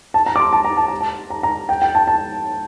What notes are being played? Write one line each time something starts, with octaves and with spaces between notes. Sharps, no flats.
A5
A#5
D6
C6
A5
A#5
A5
A#5
A5
A#5
A#5
G5
G5
A5
A5